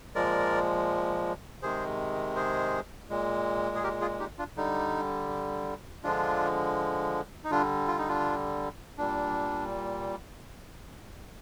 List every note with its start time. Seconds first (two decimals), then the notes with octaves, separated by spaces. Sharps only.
0.15 A#2 F3 G#3 A#4 D5
1.62 C3 D#3 G#3 G#4 C5
2.36 G#4 C5
3.10 A#2 G#3
3.76 G#4
3.83 G4 A#4
4.01 F4 G#4
4.20 D#4 G4
4.38 D4 F4
4.57 D3 G3 D#4
6.04 D3 F3 G#3 D4 F4
7.44 D#4
7.51 D3 G3 D4 F4
7.88 F4
7.98 D#4
8.08 D4 F4
8.98 A#2 G3 D4